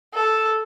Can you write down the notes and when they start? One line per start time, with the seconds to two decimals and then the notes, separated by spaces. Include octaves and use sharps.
0.14 A4